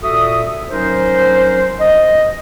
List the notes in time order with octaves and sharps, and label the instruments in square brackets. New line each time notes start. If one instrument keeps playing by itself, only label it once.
[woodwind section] A#2 F#4 A4 E5 D#6
F#3 C#4 D#4 A#4 C5
D#5